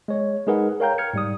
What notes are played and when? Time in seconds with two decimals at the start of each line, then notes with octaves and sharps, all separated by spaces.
0.08 G#3 C#5
0.47 G#3 D#4 G#4 A#4 B4 F#5
0.80 A#4 C#5 F5 G5 A#5 G6
0.98 F6 G#6 C#7
1.13 G#2 G3 D#6